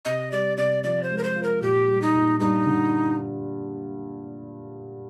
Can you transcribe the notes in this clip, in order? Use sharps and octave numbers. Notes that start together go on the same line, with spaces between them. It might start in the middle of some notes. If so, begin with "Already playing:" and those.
C3 D#5
G3 D5
C3 D5
F3 D5
C5
G#3
A#4
C5
F4
A#4
A#2 G4
G3
D#4
A#2
G2 D#4
D3